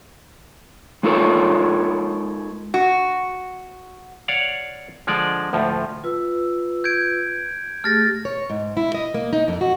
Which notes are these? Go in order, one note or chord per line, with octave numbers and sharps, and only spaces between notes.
G#3 D#4 F4 A4 A#4 C#5
F#4
C#5 D5 F5 F#5
D3 F3 G#3 D5
D2 A2 F3
F4 B4 E6
G6 G#6 D7
A3 G4 G#4 F6 A6 A#6
C#5
G#2
E4
D#5
A#3
D#4
F2
F#4